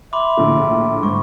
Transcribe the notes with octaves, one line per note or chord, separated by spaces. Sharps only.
E5 B5 C6 D6
A#1 A2 D3
G#2 C#6